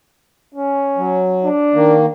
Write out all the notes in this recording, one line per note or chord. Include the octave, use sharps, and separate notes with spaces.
C#4
F#3
D4
D#3 A#3